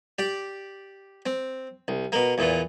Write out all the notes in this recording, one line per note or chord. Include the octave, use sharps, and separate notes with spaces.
G4 D5
C4
C2
B2 A#3
E2 A#2 E3